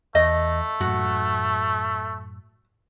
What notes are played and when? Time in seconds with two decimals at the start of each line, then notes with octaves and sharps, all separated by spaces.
0.15 E2 A3 D#5
0.81 F#2 A2 F#4